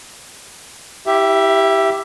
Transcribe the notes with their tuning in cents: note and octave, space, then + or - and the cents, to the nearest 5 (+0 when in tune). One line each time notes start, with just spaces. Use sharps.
E4 -25 G4 +0 E5 +15